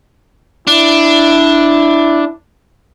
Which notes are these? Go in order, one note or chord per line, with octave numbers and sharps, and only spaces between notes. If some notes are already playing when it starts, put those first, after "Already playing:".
D4 E4